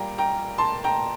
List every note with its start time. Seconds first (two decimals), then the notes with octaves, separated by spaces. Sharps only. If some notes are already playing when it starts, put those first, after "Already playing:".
Already playing: A#2 G3 A#3 G5 A#5
0.18 G5 A#5
0.58 A5 C6
0.84 G5 A#5